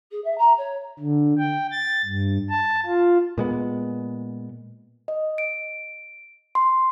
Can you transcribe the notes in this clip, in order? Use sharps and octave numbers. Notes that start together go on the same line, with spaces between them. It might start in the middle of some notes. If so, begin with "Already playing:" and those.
G#4
E5
A#5
C#5
D3
G5
A6
G2
A5
F4
A#2 G#3 B3
D#5
D7
C6